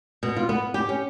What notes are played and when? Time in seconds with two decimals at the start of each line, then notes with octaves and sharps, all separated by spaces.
0.23 B2
0.36 F4
0.49 B3
0.74 G4
0.89 C#4